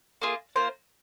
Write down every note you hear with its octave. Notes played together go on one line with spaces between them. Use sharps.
A#3 F4 G#4
A#3 F4 C5